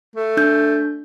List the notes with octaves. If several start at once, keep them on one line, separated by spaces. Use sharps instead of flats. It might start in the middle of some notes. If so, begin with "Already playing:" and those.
A3
D4 G6